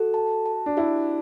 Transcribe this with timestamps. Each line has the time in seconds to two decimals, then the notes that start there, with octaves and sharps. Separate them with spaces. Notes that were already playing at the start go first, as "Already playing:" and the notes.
Already playing: F#4 A4
0.14 A5
0.46 A5
0.66 D4
0.77 E4 G4